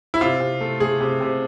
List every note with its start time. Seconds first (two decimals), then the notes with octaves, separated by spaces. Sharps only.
0.14 E4
0.21 C3 F4
0.41 C3
0.61 A3
0.80 A3 G#4
1.00 C3
1.21 C3